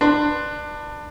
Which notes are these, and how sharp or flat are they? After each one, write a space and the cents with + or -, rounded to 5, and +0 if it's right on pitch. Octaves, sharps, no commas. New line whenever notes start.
D4 +20 B4 -10 C6 +0